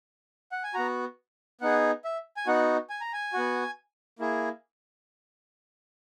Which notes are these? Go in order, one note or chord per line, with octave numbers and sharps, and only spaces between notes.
F#5
G#5
B3 F#4 A#5
B3 D#4 G#4 F#5
E5
G#5
B3 D#4 F#4 F#5
G#5
A#5
G#5
B3 F#4
A#3 E4 G#4